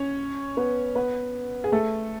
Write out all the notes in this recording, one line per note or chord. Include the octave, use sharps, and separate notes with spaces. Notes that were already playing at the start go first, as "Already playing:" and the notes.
Already playing: C#4 C#5
B3 B4
B3 B4
G#4
A3 A4